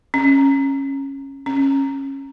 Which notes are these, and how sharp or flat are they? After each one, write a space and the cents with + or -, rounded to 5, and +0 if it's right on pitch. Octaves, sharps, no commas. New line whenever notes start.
C#4 -15
C#4 -20